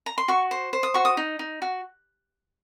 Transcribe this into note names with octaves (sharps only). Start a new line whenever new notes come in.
A#5
C6
F#4 C#6
C5
C5
D#6
F#4 C#6
D#6
D#4
D#4
F#4